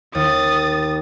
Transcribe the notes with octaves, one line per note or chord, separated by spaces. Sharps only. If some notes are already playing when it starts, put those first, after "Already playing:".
D#2 D#6 A6